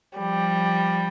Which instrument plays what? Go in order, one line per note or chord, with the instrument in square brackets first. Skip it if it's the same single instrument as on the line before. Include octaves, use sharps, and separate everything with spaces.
[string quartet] F3 G3